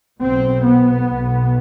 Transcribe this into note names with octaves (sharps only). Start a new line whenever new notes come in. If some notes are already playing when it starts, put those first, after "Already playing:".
B1 B2 C4
B3
B1 B2